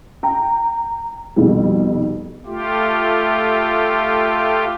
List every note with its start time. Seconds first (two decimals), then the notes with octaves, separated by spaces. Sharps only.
0.23 G5 A#5
1.36 C2 F2 B2 D#3 G3
2.46 A3 F4 G4